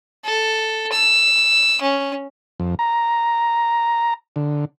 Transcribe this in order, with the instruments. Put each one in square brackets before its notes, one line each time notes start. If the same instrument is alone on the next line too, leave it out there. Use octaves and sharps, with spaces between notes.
[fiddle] A4
E6
C#4
[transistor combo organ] F2
A#5
D3